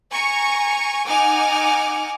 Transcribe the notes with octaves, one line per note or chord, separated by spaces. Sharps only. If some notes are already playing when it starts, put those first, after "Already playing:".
G#5 A#5 C#6
D#4 F#5 G#5 D6 F6